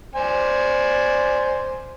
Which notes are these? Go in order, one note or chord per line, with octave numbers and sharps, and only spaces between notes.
C5 D5 G#5